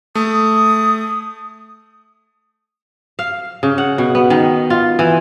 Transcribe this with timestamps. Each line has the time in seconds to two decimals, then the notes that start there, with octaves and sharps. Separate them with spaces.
0.15 A3 D#6
3.19 F5
3.63 C#3
3.78 F#5
3.98 B2
4.15 B3
4.30 D#3
4.70 F4
4.99 E3